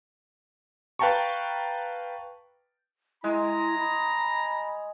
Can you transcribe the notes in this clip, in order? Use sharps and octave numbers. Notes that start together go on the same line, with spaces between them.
B4 F5 G5 A5 A#5 C#6
G#3 E4 A#5
B5